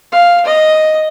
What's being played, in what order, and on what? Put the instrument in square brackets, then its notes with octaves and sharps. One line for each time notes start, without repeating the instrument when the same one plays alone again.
[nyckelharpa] F5
D#5